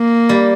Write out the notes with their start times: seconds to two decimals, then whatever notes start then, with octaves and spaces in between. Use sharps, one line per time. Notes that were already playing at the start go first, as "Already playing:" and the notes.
Already playing: A#3
0.29 G3